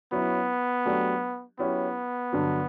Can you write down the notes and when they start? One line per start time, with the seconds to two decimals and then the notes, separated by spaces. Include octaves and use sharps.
0.12 F#3 B3 C#4 E4
0.86 F#3 A3 D4 G4
1.59 F#3 B3 C#4 E4 G4
2.33 G2 D3 F#3